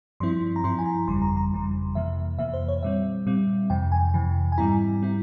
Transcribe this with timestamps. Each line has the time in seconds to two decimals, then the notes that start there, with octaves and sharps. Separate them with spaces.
0.20 G2 F3 C4 E4 C6
0.56 A#5
0.64 G2 F3 C4 E4 C6
0.79 G#5
0.86 A#5
1.07 G1 F2 C#3 E3 G3 C6
1.22 A#5
1.36 A#5
1.52 G1 F2 C#3 E3 G3
1.95 F2 C3 E3 A#3 E5
2.39 F2 C3 E3 A#3 E5
2.53 C5
2.68 C#5
2.83 A#2 G3 C4 E5
3.26 A#2 G3 C4
3.70 F2 C3 E3 G5
3.92 G#5
4.14 F2 C3 E3
4.52 G#5
4.58 G#2 G3 C4 E4 A#5
5.02 G3 C4 E4